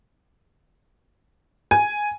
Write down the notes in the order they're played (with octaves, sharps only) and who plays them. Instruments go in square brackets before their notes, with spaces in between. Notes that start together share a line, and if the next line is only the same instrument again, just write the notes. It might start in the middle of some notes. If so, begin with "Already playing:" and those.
[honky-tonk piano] G#5